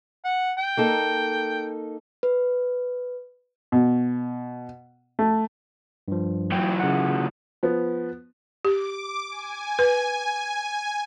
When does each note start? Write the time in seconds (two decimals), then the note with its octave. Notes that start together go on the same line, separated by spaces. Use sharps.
0.24 F#5
0.58 G5
0.77 A#3 D#4 A4
2.23 B4
3.72 B2
5.19 A3
6.08 G2 F3
6.52 E3 F#3 G5
6.80 C#3 F#5
7.63 F3 B3
8.65 G4 D6
9.30 G#5
9.79 B4